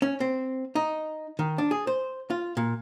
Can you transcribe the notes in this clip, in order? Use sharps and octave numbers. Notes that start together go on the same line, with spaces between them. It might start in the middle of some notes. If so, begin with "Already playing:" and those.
C#4
C4
D#4
D#3
D4
G#4
C5
F4
A#2